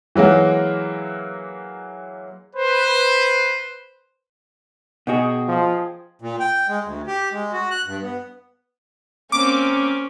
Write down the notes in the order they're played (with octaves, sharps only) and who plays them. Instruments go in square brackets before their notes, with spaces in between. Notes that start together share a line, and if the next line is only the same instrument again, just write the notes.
[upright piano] E3 F#3 G#3 A#3
[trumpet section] B4 C5
[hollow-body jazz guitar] B2 F#4 [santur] G#4 D#5 G5
[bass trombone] F3
[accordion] A#2
G5
G#3
D2
G4
G#3
F#4
F#6
G2
B3
[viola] A#3 C4 [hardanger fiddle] C#4 [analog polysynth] D6